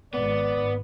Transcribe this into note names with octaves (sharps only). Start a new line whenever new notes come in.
G#1 G#2 B3 D5